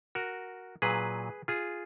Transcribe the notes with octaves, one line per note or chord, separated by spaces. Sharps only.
F#4 A#4
A#2 F#3 G#4 B4
F4 G#4